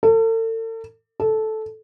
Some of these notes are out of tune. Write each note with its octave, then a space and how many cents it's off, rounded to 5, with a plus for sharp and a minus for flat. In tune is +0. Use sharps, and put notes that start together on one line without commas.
A4 +40
A4 -10